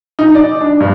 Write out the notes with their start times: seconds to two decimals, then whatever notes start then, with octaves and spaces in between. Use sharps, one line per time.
0.19 D#4
0.35 D5
0.61 D4
0.80 G2